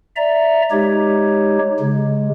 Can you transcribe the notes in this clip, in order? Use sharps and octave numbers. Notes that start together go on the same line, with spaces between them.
D5 E5 A#5
G#3 D#4 G4 C#5
C#3 G#3